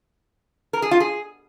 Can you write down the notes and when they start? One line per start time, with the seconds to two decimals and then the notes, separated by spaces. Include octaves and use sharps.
0.73 A#4
0.82 G#4
0.91 F4
1.00 G#4